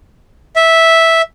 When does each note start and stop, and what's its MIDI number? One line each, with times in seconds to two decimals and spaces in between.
0.56 1.22 76